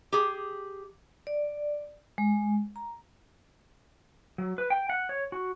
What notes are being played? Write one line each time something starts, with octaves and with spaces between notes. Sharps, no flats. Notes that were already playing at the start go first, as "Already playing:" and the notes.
G4 G#4
D5
G#3
A#5
F#3
B4
G5
F#5
C#5
F#4